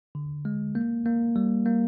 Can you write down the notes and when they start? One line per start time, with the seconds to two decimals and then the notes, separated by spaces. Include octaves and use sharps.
0.15 D3
0.45 G#3
0.75 A#3
1.06 A#3
1.36 G3
1.66 A#3